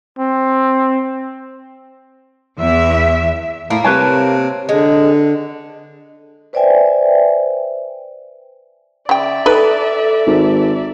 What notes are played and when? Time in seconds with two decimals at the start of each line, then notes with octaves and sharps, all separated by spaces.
0.19 C4
2.59 E2 E5
3.70 A2 A#3
3.84 C3 B4 C#5 A5
4.69 D3 G#3
6.53 B4 C5 D5 E5 G5 G#5
9.09 C#3 D5 E5 G5
9.46 D#4 A4 B4
10.27 G#1